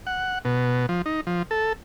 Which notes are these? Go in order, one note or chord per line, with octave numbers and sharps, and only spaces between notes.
F#5
B2
F3
D#4
F3
A4